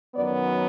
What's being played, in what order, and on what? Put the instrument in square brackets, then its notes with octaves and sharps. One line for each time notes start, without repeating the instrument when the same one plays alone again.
[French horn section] F#2 D#3 F#3 B3 D5